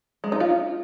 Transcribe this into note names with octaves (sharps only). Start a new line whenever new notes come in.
G#3
D#4
F4